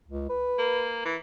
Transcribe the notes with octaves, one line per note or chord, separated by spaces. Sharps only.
C#2
B4
A#3
E3